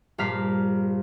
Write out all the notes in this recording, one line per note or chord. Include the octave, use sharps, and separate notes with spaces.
A#1 G2 F5 A#5 B6 C7